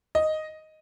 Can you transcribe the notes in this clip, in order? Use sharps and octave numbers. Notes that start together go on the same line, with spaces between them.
D#5